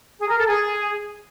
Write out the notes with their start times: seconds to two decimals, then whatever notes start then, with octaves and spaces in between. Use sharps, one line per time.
0.19 G#4
0.29 A#4
0.38 A4
0.47 G#4